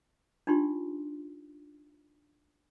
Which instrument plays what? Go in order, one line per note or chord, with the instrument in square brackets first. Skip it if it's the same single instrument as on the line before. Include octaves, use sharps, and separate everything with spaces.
[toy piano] D4 D#4 F4 G4 C6